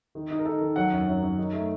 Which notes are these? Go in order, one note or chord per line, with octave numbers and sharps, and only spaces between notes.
D#3
D#4
A#4
D#4 A4
D#3
F#3 F#5
F#2
F#2
F#2
D#4
A3